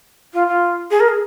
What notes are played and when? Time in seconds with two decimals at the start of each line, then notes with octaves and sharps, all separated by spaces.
0.33 F4
0.47 F4
0.90 G#4
1.00 A#4
1.08 G#4